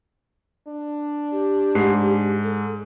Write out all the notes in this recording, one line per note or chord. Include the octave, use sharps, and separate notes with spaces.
D4
G4
G#2 C7
A4